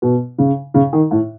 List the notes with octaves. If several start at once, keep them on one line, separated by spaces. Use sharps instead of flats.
B2
C#3
C#3
D#3
A2